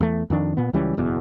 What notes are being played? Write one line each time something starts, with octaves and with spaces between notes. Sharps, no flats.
E2 A3
F2 D#3 D4
A#2 B3
C#2 E3 G3 C#4
F#1 E2 B2